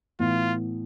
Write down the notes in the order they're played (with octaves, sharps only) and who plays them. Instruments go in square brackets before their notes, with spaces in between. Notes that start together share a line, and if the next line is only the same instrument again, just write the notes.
[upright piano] A2 E3 B3 [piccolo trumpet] F4